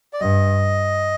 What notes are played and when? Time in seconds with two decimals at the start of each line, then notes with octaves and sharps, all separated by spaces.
0.13 D5
0.20 G2 D#5